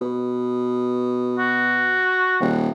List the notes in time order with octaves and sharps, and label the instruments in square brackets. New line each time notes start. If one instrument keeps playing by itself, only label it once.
[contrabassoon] B2
[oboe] F#4
[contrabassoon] D#1